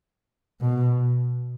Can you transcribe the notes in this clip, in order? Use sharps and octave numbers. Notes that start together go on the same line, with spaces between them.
B2